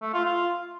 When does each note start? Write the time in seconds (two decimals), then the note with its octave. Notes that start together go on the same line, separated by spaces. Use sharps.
0.02 A3
0.13 F4
0.25 F4